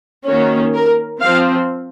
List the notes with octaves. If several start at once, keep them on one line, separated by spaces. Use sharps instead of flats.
D#3 A#3 C#4 F#4
A#4
F3 C4 F5